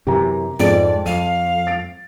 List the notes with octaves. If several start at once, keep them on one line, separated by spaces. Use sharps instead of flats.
F#2 C3 E3 G4 A#4 A#5
F2 G#2 G#4 D5 D7
F2 F5 D#7
A6 D7